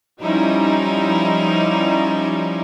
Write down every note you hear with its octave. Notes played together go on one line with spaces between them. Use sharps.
F3 G3 C#4 D#4 E4